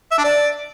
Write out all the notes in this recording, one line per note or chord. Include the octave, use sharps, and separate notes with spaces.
E5
D4
D5